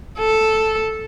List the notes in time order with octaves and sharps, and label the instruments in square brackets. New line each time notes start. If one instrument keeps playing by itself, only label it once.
[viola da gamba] A4